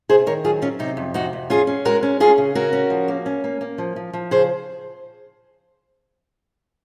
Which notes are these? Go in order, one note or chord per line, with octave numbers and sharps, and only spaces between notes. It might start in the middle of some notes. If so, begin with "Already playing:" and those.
C3 G#4 C5
D#3 A#4 C#5
F#3 F4 G#4
F#3 C#4 F4
C3 D#4
F2
C3 D#4 F#4
F2
C#4 F4 G#4
C#4
G#3 F#4 A#4
C#4
C#4 F4 G#4
C#3
C#4 F#4 A#4
C#4
F3
A#3
C#4
A#3
A#3
F3
F3
F3
C#3 G#4 C5